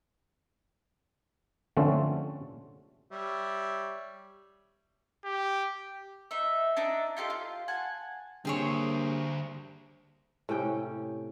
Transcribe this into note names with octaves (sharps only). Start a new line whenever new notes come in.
D3 F3 A3 C4 C#4
G3 C#5 E5
G4
D#4 E5
D4 D#4 E5 A#5
D#4 F4 G4 A4
F4
F#5 G#5 A5
G2 D3 A#3 C4 G#4 C5 C#5
A2 C3 C#4 G5